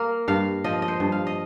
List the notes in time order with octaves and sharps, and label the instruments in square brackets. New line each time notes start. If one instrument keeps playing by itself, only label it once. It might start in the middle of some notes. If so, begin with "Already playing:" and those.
Already playing: [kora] A#3 A#4
G2 F5
F3 D#5
D#5
C5
G2
F5
D#5